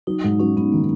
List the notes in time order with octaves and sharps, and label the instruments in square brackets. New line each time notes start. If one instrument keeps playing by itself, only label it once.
[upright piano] F#3 [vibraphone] D#4
[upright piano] G#2 [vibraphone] D#4
[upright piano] F#3 [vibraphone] C#4
[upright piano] G#2 [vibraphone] B3
[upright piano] D#3 [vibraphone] A#3